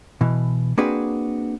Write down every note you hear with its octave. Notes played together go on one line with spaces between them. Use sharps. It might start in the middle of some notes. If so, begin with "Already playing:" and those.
B2 E3
A#3 C4 D4 F#4 G#4 B4